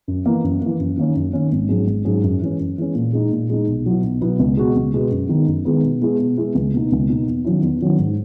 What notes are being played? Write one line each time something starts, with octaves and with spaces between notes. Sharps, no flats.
F#2
E3 A#3
F#2
E3 A#3
F#2
D#3 A#3 C#4
F#2
D#3 A#3 C#4
G#1
G#2 F#3 C#4 G#4
G#1
G#2 F#3 C#4 G#4
F#2
E3 G#3 C#4
F#2
E3 G#3 C#4
A#2
G#3 D#4
A#2
G#3 D#4
B1
B2 F#3 B3 E4
B1
B2 F#3 B3 E4
C#2
B2 G#3 B3 F#4
C#2
B2 G#3 B3 F#4
F#2
D#3 G#3 B3
F#2
D#3 G#3 B3
B2
G#3 B3 E4 G#4
B2
G#3 B3 E4 G#4
C#2
B2 A#3 D#4
C#2
B2 A#3 D#4
E2
D#3 F#3 C#4 E4
E2
D#3 F#3 C#4 E4
G#2